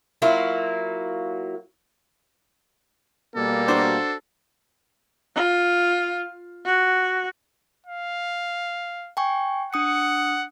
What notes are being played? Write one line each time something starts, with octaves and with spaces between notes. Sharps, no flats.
F#3 A#3 E4 F4
B2 G3 A#3 A4
D4 F#4 C5
F4
F#4
F5
G5 G#5 C#6
D4 F#5 D#6 C#7